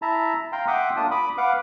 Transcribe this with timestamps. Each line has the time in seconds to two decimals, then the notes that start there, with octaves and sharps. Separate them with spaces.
0.02 E4 E5 A5 A#5
0.52 F5 G5 A#5 C6
0.67 E5 F#5 G5 C6 D6 D#6
0.96 A#3 D4 F4 A5 D#6
1.11 B5 D6 D#6
1.37 B4 F5 F#5 D6